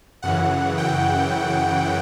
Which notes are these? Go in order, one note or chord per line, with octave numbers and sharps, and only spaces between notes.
F#2 C#3 E3 F#5
G5